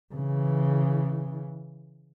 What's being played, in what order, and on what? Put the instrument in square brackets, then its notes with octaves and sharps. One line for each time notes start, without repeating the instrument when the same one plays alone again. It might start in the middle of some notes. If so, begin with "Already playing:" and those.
[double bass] C#3 E3